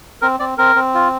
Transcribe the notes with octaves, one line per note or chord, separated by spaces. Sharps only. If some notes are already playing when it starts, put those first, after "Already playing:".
C4 A#4
C4 D5
C4 A#4
C4
F4